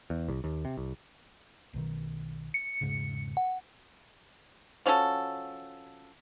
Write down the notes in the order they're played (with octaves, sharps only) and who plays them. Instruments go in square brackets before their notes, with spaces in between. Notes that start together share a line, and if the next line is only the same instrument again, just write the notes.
[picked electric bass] E2
C2
D#2
C3
C2
B1 B2 D#3
[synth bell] C#7
[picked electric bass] E1 G#2 C#3
[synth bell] F#5
[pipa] F3 C#4 F#4 A4